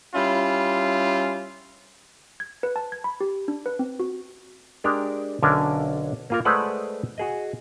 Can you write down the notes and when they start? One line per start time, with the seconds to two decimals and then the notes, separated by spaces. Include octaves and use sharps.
0.14 G3 C#4 E4 F4
2.40 G#6
2.63 B4
2.76 A5
2.92 G#6
3.04 B5
3.21 G4
3.48 D4
3.66 B4
3.79 C4
4.00 F#4
4.84 G#3 D4 G4 A#4
5.42 B1 D3 C#4 D4 A#4 G#5
6.30 A#3 F4 A#4
6.45 G#3 A3 B4 C5 D5 F#5
7.18 F#4 G#4 D#5